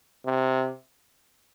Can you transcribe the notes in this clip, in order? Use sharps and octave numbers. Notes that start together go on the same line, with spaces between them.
C3